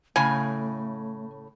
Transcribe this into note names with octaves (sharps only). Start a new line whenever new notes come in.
A2 C#3 A3 G#5